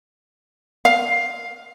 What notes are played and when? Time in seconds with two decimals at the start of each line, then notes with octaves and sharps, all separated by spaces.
0.85 F5